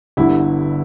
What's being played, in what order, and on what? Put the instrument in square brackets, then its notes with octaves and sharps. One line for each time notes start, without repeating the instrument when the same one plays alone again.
[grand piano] G1 G2 D3 E4